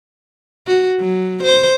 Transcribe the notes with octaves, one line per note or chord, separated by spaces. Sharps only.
F#4
F#3
C5